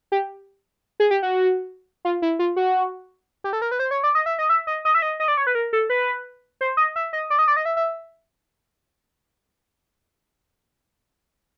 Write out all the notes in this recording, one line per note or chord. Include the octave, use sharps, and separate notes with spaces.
G4
G#4
G4
F#4
F4
E4
F4
F#4
G4
A4
A#4
B4
C5
C#5
D5
D#5
E5
D#5
E5
D#5
D#5
E5
D#5
D#5
D5
C#5
B4
A#4
A4
B4
C5
D#5
E5
D#5
D5
D#5
D5
D#5
E5
E5